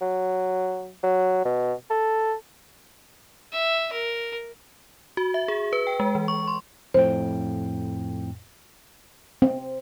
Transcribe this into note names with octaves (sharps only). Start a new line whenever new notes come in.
F#3
F#3
B2
A4
E5
A#4
F#4
E5
G#4
B4
G5
G#3
E3
C#6
C6
F2 A2 C5 G5
C4